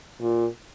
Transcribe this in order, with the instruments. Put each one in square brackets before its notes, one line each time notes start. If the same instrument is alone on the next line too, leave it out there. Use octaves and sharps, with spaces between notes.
[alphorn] A#2